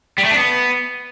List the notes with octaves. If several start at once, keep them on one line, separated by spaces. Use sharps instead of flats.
G3
A3
D4
B3